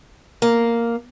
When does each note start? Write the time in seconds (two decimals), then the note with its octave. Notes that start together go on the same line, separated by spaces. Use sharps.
0.42 A#3